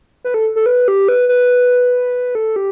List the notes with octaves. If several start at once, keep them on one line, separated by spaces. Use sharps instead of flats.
B4
A4
A4
B4
G4
B4
B4
A4
G4